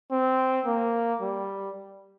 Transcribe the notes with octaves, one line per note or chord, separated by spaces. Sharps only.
C4
A#3
G3